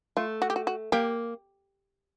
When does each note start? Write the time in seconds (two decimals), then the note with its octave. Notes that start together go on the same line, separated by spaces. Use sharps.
0.17 A3 F4
0.42 F#4
0.50 G4
0.56 F#4
0.67 F#4
0.92 A#3 G4